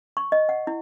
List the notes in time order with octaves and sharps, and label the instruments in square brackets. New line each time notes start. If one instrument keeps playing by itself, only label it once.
[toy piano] C#6
D#5
F#5
E4